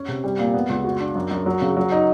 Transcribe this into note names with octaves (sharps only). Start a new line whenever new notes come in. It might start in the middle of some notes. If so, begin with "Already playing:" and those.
Already playing: C#4
C3
G3
A#2
B3
C#2
F#4
D4
F#2
F#2
F#3
C#3
F#3
D#4